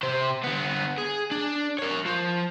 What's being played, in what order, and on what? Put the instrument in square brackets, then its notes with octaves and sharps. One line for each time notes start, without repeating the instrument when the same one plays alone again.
[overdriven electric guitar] C3 C5
D3 B3
G#4
D4
A#4 C#5
F3